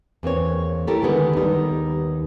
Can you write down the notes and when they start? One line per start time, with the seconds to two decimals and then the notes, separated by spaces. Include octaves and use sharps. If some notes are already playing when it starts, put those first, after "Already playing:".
0.23 E2 A#3 C4 C#5
0.87 A3 E4 G4 A4 A#4
1.02 D3 D#3 G#3 B3 D#4
1.37 D#2 G3 B3 D#4